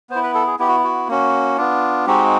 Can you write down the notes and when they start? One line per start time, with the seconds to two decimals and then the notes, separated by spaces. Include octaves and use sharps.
0.10 B3 C5
0.15 E4
0.23 B4
0.35 A4
0.47 G#4
0.59 B3 E4 G4
0.68 F#4
0.84 F#4
1.08 A#3 C#4 F#4
1.57 B3 D4 F4
2.06 G#3 C4 D#4 F#4 G4